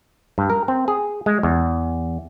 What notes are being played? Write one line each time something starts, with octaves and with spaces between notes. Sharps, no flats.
G2
A#4
C4
G#4
G#3
E2